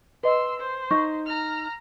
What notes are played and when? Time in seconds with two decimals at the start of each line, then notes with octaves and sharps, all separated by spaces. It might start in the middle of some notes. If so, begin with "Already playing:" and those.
0.23 B4 D#5 C6 E6
0.60 C5
0.91 D#4 C#6
1.26 A#5 F6